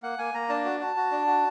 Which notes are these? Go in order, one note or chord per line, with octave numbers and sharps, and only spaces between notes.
A#3 F#5
A#3 G#5
A#3 A#5
D4 A5
F#4
F#4
F#4
D4
F#4